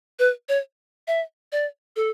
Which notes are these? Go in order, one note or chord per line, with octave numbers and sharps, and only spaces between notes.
B4
C#5
E5
D5
A4